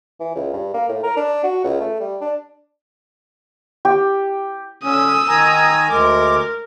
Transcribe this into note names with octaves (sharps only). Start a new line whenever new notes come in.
E3
C#2
G2
A#3
A2
A#4
D4
F#4
C#2
A3
G3
D4
G4
D3 C#4 D#6 E6
D#3 G#5 A#5
D2 G#3 A#4 D6